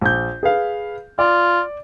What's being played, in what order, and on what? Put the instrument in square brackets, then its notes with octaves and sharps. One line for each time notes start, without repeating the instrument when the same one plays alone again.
[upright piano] A#1 G6
G#4 B4 F5
[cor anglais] F4 [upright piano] D5